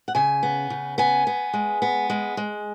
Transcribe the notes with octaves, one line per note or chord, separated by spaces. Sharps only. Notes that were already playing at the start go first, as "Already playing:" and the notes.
F#5
C#3 G#5
B3
C#3
B3 G#5
B3
G#3
B3
G#3
G#3